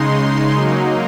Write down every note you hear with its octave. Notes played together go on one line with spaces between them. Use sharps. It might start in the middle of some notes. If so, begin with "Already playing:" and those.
Already playing: C#3 G#3 D#4 C6
C6
F#3 A#3 D#4